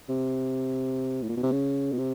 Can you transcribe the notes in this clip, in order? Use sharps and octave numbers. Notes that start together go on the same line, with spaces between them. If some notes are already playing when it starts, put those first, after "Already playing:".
C3
A2
A#2
B2
C3
C#3
B2
C3